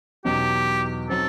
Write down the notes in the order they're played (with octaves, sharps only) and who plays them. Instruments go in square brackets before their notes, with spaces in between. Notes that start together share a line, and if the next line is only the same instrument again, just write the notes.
[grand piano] E2 B2 F#3 B3 D#4 [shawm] G4
[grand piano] F#3 C4 D#4 [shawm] A4